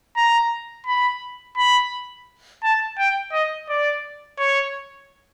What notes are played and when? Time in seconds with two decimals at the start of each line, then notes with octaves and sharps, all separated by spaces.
0.17 A#5
0.87 B5
1.57 B5
2.63 A5
2.98 G5
3.33 D#5
3.69 D5
4.39 C#5